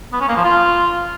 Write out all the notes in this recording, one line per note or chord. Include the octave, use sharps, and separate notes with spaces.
B3
C#4
A#3
F3
F4